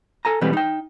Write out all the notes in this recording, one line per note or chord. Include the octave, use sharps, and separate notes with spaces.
A4 G#5 A#5
B2 E3 G3 G#3 C4 B4
D#4 G5